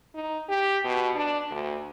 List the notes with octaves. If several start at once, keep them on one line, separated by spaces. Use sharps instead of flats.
D#4
G4
B2
D4
D2